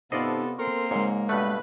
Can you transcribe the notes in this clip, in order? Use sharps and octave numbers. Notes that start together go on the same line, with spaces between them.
C3 B3 D#4 F4 A4 C5 D5 D#5
A#3 C4 A4 A#4 C6
G#2 G#3 C#5
G2 B2 A3 B4